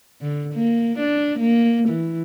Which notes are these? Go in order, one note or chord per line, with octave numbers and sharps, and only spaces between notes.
D3
A#3
D4
A#3
E3